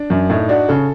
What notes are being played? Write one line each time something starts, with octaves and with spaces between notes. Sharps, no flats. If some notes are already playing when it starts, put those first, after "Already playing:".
Already playing: D4
F#2
A2 D#4
D4 F#4
C#3 A4